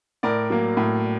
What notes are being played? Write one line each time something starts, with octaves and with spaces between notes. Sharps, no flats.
A2 A#4 D5
F#3 A#3
A2